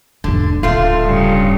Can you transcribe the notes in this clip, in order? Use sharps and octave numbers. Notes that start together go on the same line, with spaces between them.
E1 G#2 D3
D1 D3 A3 F4
G2 C#3